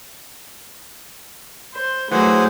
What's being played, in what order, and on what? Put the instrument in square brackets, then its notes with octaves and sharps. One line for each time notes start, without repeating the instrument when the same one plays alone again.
[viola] C5
[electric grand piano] E3 F#3 [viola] A3 [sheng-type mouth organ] G#4 C5 F#5